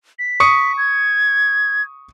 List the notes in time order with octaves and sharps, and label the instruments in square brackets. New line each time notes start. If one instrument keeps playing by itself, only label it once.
[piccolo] B6
[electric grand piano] C#6 D#6 C#7
[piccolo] G#6